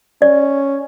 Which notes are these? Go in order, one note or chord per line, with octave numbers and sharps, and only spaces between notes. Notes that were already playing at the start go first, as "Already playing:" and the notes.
C#4 D5